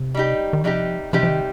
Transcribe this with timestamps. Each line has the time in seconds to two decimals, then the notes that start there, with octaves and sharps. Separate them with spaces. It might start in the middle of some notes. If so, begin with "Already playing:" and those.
Already playing: C3
0.15 G3 D#4 G4
0.53 D#3
0.64 C3 F3 G3 D#4 G4
1.13 C3 F3 G3 D#4 G4
1.23 F3
1.29 D#3